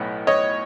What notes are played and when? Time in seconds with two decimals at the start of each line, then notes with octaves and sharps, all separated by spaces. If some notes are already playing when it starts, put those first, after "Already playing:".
Already playing: B1 A2 B3
0.27 C#5 D#5